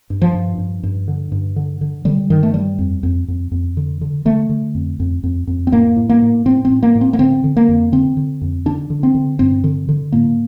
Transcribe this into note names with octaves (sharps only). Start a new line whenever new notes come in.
G2
F3
G2
G2
G2
D3
G2
D3
D3
D3 G3
G2 D#3
A3
G2 G3
F2
F2
F2
F2
D3
D3
D3 A3
D3
F2
F2
F2
F2
C4
A2 A#3
A2
A#3
A2
A2 C4
C4
A2
A#3
A2
C4
A#3
D3 C4
D3
A#3
F2
D3 C4
D3
F2
D3 D4
D3
C4
D3
G2 C4
D3
D3
A2 A#3